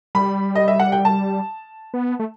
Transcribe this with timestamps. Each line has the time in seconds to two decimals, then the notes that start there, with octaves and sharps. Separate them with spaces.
0.15 G3 B5
0.55 D#5
0.68 E5
0.80 F#5
0.92 G5
1.05 A5
1.94 B3
2.19 A3